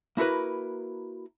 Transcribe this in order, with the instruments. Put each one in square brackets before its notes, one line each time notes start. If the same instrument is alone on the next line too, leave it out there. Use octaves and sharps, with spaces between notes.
[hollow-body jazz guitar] A#3 E4 F#4 A#4 B4